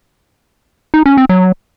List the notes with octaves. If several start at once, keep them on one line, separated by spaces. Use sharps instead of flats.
D#4
C#4
C4
F#3